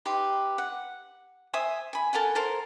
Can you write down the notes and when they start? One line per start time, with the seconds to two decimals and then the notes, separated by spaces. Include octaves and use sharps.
0.05 D#4 G4 B4 C6
0.58 F#5
1.53 C5 E5 G#5 D#6
1.93 G#5 B5
2.13 A4 A#4 F#5 G#5
2.35 A4 A#4 C5